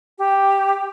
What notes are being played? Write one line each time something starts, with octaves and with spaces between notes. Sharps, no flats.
G4